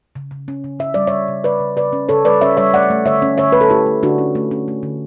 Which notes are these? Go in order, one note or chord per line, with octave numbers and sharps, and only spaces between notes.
C#3
C#3
C#4
C#3
C#3 E5
G3 D5
C#3 C#5 E5
C#3
C#3 B4 D5
C#3
C#3 B4 D5
C#4
C#3 A4 C#5
G3 B4 D5
C#4 C#5 E5
G3 C#5 E5
A3 D5 F#5
A3
D3 C#5 E5
C#4
D3 C#5 E5
A3 B4
A4
A3 E4 G4
A3
D3 D4 F#4
C#4
A3
C#4
A3
D3